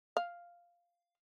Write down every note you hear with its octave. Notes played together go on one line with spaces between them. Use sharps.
F5